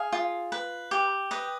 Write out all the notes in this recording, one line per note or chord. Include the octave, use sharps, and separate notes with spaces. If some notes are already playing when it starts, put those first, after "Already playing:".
Already playing: G#4 F5
F4
B4
G4
B4 D#5